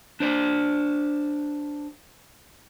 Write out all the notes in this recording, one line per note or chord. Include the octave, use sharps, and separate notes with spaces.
D4 C5 D5